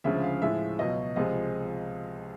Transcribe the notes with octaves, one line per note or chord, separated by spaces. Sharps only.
D2 C#3 F3 G#3 E5
F5
A2 F3 G#3 E5
C#2 B2 F#3 D#5
C#2 C3 F3 G#3 D#5